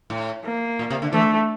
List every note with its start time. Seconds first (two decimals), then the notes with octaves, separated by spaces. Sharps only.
0.10 A2
0.45 A#3
0.79 A#2
0.90 C3
1.02 D3
1.13 E3 A3